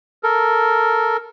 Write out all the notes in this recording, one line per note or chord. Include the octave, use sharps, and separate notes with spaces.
A4 A#4